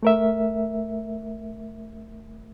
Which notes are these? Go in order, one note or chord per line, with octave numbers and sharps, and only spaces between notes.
A3 A#4 E5